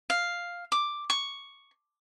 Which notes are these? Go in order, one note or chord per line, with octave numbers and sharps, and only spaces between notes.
F5
D6
C#6